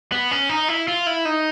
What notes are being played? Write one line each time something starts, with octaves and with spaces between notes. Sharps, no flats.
B3
C#4
D#4
E4
F4
E4
D#4